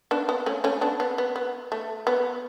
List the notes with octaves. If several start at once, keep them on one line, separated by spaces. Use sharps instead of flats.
B3 D4
B3
A3 C#4
A3 C#4
B3 D4
B3
B3
B3
A3
B3